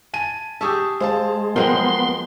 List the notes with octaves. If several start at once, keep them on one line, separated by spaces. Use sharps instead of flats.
G#5 A5 D#7
G4 G#4 E5 A5 C#6 E6
G#3 C5 F5 A5
F3 F#3 G#3 B3 A#4 C5 G5 C6